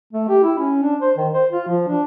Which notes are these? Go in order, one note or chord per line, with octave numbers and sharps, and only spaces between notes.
A3
G4
E4
C#4
D4
C5
D#3
C5
F4
F3
D4